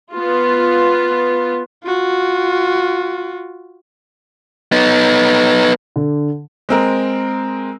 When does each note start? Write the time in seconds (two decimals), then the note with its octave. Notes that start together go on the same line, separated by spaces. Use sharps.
0.14 B3 F4
1.84 F4 F#4
4.72 B3 D#4
5.96 D3
6.69 G#3 C4 A#4